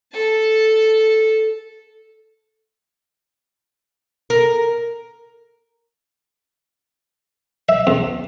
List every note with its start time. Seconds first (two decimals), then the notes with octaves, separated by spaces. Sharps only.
0.13 A4 A5
4.30 A#4
7.69 E5
7.87 E2